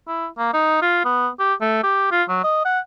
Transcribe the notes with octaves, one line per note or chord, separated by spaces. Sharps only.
E4
A#3
D#4
F4
B3
G4
A3
G4
F4
F#3
D#5
F#5